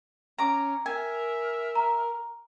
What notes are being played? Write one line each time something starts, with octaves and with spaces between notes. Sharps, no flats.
C#4 A#5 D6
A#4 E5 G#5
A#5